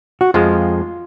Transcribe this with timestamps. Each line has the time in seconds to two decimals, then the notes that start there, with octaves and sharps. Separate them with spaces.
0.21 F#4
0.34 F2 F3 G#3 F4